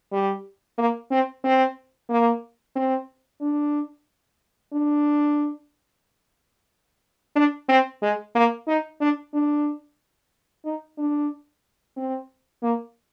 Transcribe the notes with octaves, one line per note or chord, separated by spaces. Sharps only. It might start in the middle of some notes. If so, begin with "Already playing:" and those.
G3
A#3
C4
C4
A#3
C4
D4
D4
D4
C4
G#3
A#3
D#4
D4
D4
D#4
D4
C4
A#3